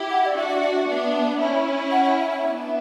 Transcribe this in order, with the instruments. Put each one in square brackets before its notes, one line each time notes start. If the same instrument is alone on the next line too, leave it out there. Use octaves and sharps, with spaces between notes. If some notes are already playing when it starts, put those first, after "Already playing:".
Already playing: [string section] E4 G4
[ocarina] F#5
D5
[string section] D4 F#4 [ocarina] E5
[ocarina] E5
D5
E5
[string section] B3 D4 [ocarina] E5
[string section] C#4 E4
[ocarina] F#5
F#5
E5
E5
[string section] B3 D4